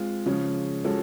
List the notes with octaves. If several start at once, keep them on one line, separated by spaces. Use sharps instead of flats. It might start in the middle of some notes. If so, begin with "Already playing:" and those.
Already playing: G#3 C4 F4
C#3 F3 G#3 C#4
F3 G#3 C#4 F#4 A4